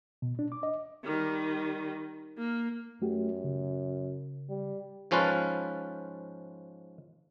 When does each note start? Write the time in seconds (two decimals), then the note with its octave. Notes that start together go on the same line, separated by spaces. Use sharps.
0.22 B2
0.39 D4
0.52 D6
0.63 D#5
1.04 D#3 G3
2.37 A#3
3.02 F#2 A3 F#4 G4
3.44 C#3
4.49 G3
5.11 G#2 F3 C#4 F4 B4 A5